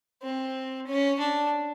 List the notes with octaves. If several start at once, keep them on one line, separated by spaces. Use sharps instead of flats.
C4
C#4
D4